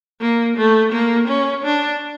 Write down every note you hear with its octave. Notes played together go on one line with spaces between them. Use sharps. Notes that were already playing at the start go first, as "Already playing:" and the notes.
A#3
A3
A#3
C#4
D4